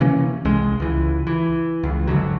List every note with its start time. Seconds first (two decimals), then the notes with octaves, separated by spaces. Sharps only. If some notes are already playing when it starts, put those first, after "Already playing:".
0.01 C3 E3 A#3 C#4
0.45 C2 G#3
0.80 C#2 E3
1.27 E3
1.83 C#2
2.07 G1 G#2 D3 F#3